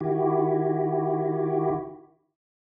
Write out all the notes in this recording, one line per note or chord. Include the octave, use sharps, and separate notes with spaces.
D#3 E4 F#4 G4